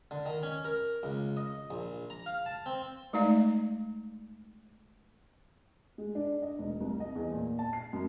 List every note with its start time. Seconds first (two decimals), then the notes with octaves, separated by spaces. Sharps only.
0.11 D3
0.26 D#3
0.43 C#4
0.65 A#4
1.03 C#2
1.37 D#5
1.70 A#1
2.10 A#5
2.26 F5
2.46 A5
2.66 C4
3.13 G#3 A3 D#4 D5 F5
5.98 G#3
6.15 D4
6.42 D#5
6.59 E1
6.80 C2
7.00 D#5
7.15 E2
7.32 A#2
7.59 A5
7.73 C7
7.93 F#2